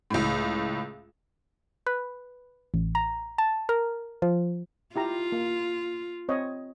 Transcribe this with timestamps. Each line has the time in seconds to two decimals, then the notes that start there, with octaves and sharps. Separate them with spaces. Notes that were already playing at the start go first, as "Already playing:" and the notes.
0.10 C#2 A2
1.87 B4
2.74 A1
2.95 A#5
3.38 A5
3.69 A#4
4.22 F3
4.96 E4 F4 G4 A#5
5.32 A#3
6.29 C4 C#5 D#5